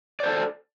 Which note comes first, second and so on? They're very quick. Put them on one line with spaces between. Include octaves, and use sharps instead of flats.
D5 C5 A4